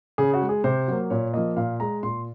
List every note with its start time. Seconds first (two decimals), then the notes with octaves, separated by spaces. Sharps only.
0.18 C#3 G#4
0.34 F#4
0.42 G#3
0.49 G#4
0.64 C3 C5
0.88 F#3 A#3
1.10 A#2 C#5
1.34 F3 A#3 D#5
1.56 A#2 F5
1.80 G#3 A#5
2.03 A#2 C6